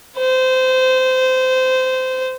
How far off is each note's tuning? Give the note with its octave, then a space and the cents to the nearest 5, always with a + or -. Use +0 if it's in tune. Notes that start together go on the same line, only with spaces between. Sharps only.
C5 -20